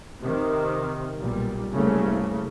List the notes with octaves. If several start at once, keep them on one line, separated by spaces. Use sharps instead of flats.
C3 D#3
B1 A#2 G3
F#1 C2 C#3 A3 A#3